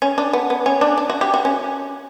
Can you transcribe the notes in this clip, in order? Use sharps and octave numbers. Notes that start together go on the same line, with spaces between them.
C#4
D4
B3
B3
C#4
D4
D4
F#4
G4
F#4
C#4